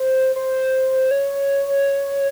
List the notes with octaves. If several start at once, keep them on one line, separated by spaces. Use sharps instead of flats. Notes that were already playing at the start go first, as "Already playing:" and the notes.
Already playing: C5
C5
C#5